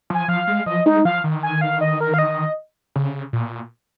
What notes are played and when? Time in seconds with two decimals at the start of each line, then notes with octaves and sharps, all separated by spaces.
0.10 F3 G#5
0.28 F3 F5
0.47 G#3
0.66 F3 D#5
0.86 G#3 D#4
1.05 F3 F5
1.24 D#3
1.43 G#5
1.61 F5
1.81 D#5
2.01 A#4
2.14 F5
2.19 D#5
2.96 C#3
3.33 A#2